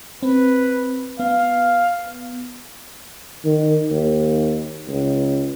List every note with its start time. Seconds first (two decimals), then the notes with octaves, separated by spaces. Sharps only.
0.23 C4 B4
1.19 B3 F5
3.45 D#3
3.91 D#2
4.88 C#2